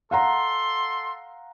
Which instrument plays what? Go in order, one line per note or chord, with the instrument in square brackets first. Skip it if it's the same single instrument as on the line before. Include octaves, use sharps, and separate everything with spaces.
[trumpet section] A4 C6 [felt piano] F5 F#5 A#5